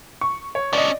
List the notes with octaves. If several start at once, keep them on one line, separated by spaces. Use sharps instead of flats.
C#6
C#5
C#4 D4 D5 D#5